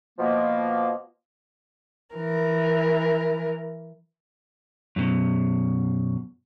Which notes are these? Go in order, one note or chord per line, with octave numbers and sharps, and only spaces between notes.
B2 F3 A#3
E3 A#4
F#2 B2